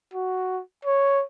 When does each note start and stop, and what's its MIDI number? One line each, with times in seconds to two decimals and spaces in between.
0.14 0.61 66
0.85 1.23 73